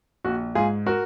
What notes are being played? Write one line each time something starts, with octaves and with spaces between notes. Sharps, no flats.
A#1 F#4
G#2 F4 G#4
F#4 A#4